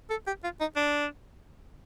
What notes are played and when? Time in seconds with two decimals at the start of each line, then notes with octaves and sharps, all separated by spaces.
0.10 A4
0.27 G4
0.43 F4
0.60 D#4
0.76 D4